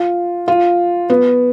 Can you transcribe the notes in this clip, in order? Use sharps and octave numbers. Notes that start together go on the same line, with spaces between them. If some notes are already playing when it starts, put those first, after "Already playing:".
Already playing: F4
F4
B3